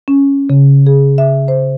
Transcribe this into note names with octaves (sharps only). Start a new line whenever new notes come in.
C#4
C#3
G#4
E5
C5